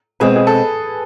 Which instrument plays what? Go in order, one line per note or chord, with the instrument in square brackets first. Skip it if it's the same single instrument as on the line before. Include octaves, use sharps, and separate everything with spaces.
[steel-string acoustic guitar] B2 G#3 C4 [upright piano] G#4 B4
[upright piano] G#4
A4